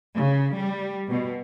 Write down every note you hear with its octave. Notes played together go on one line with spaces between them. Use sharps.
C#3
G3
B2